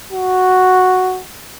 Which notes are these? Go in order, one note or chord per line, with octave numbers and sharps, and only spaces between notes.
F#4